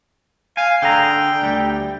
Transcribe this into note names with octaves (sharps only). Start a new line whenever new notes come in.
F5 G#5
D3 G#4 G5 A#5
D2 G3